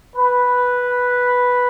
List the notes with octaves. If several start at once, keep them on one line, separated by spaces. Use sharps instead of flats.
B4